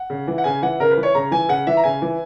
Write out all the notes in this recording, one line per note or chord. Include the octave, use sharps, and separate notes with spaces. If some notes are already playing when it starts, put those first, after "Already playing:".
Already playing: F#5
C#3
E3
F#5
C#3 G#5
E3 F#5
C#3 A#4
B4
E3
C#5
C#3 A#5
E3 G#5
C#3 F#5
E3 E5
A#5
C#3 G#5
E3